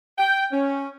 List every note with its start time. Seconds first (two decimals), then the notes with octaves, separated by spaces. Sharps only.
0.18 G5
0.52 C#4